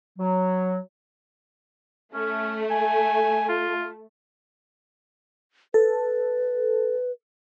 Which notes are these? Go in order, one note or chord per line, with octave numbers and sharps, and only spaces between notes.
F#3
A3 C#4
G#5
F4
A4 B4